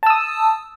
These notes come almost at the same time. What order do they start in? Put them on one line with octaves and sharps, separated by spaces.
A5 E6 D#6